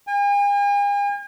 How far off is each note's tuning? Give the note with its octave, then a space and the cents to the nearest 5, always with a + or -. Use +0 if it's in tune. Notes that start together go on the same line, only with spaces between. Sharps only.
G#5 -45